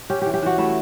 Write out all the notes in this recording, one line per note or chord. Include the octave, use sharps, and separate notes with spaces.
C#4 G4
E3 G4
G4
E3 F#4
A3 E4